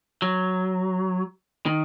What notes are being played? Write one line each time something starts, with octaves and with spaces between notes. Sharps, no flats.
F#3
D#3